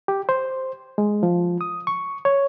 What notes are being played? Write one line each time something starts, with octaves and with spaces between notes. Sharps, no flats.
G4
C5
G#3
F3
D#6
C#6
C#5